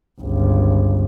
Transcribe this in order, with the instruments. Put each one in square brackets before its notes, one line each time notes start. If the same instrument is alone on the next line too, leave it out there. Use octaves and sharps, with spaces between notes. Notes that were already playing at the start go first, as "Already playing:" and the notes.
[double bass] G1 C#2